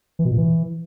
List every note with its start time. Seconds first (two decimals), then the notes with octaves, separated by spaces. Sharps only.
0.19 E3
0.25 B2
0.31 A#2
0.38 E3